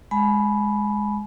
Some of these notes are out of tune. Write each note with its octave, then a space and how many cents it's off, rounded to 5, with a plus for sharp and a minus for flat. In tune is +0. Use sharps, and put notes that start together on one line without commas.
G#3 +0 G#5 +35 B5 -5